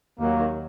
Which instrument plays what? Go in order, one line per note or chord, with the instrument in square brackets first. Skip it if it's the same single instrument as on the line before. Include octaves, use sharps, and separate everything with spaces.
[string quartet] D#2 D#3 F#3 [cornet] A#3